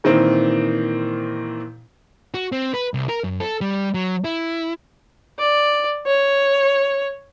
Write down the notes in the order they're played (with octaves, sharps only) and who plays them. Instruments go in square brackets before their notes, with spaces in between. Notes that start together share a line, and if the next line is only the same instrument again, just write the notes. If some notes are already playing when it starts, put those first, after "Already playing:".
[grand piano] A#2 D#3 E3 C4
[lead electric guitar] F#4
C4
B4
C2
A#4
F#2
A4
G3
F#3
E4
[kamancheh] D5
C#5